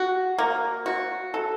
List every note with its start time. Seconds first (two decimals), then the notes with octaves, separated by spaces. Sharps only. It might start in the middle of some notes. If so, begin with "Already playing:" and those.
Already playing: F#4
0.38 A#3
0.86 F#4
1.34 A4